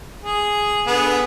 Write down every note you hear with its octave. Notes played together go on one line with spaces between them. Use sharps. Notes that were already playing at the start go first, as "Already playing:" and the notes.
G#4
D3 B3 G#4